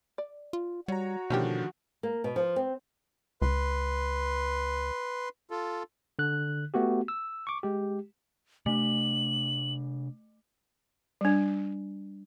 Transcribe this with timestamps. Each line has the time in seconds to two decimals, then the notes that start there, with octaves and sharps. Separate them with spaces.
0.18 D5
0.53 F4
0.88 G3 F#4 C#5 A#5
1.30 B2 D3 D#3 F3 A3 C#4 G4
2.03 A#3
2.24 B2
2.36 F3
2.56 C4
3.42 C#2 B4 C6
5.51 F4 A4
6.19 D3 F#6
6.74 A3 B3 F#4 G4
7.08 E6
7.47 C#6 D6
7.63 G#3 G4
8.66 C3 A3 D4 F#7
11.21 G3 D4